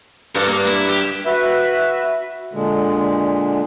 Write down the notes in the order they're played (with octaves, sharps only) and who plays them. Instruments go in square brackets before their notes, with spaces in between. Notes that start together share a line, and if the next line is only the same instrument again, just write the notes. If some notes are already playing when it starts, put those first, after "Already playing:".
[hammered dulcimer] G2 C#6 [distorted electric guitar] A4 A#4
[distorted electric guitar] A#3
E4
G4
[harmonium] F#4 B4 E5
A#2 D3 G#3